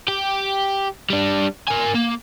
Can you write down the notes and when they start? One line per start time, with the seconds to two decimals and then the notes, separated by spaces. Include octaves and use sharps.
0.08 G4
1.10 G3 D4
1.68 A#4 G#5
1.94 A#3